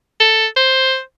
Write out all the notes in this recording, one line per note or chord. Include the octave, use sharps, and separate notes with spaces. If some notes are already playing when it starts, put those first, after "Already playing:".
A4
C5